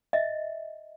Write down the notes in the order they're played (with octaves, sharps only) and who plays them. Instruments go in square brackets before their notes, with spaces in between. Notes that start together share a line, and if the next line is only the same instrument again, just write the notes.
[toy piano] D#5 E5